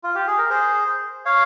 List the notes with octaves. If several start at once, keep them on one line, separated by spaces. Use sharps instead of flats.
F4
G4
G#4
A#4
G#4 C5
C#5 F5